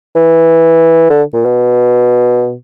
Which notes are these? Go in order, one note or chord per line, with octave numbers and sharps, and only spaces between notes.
E3
D3
A#2
B2